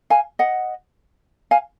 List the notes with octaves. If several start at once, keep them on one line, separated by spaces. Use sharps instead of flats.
F5 G#5
D#5 F#5
F5 G#5